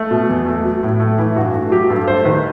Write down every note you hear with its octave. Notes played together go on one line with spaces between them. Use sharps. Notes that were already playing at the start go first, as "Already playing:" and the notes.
Already playing: A3
B2
E2
A3
F#3
A2
A3
E3 E4
G2 F#4
A3 F#4
F#3 G4
G2 A4
A3 C5
C5
D#3 B4